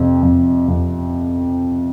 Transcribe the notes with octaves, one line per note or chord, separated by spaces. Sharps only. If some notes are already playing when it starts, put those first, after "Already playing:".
Already playing: F2 C3
F2
F2